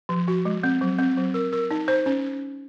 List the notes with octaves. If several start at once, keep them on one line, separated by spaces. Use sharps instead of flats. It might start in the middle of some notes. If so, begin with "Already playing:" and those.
F3
F#4
G#3
C4
F#3
C4
F#3
A#4
A#4
D#4
C5
C#4